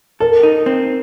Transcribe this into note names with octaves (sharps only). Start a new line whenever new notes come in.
A4 A#4
D#4
C4